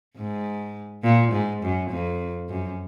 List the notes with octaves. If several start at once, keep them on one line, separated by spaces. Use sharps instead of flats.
G#2
A#2
G#2
F#2
F2
F#2